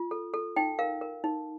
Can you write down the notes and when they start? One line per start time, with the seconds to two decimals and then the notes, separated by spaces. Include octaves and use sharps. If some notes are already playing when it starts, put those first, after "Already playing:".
Already playing: F4
0.11 A4
0.34 A4
0.56 D#4 G5
0.79 A#4 F5
1.01 A#4
1.24 D#4